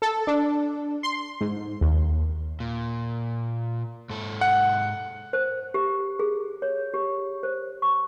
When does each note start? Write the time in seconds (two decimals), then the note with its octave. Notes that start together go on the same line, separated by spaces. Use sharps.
0.02 A4
0.27 D4
1.03 C6
1.41 G#2
1.81 D#2
2.60 A#2
4.10 G#2 A4
4.41 F#5
5.33 C5
5.74 G4
6.19 G#4
6.62 C#5
6.94 G4
7.43 C5
7.82 C#6